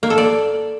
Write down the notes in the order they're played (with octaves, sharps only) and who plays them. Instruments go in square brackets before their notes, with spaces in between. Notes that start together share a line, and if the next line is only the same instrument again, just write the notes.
[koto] A#3
A4
D5